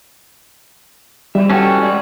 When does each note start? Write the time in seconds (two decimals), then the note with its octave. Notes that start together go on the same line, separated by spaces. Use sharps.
1.35 F3 G3 E5
1.50 C#4 E4 F#4 A4 B4 G5
1.83 E3 G#3 D5